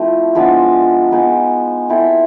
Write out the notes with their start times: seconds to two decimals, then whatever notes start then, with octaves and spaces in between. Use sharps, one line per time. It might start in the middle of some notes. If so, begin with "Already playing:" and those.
Already playing: F3 A3 C4 E4 A4
0.35 F3 G#3 B3 D4
1.12 B3 D#4 G#4
1.89 C4 E4 A4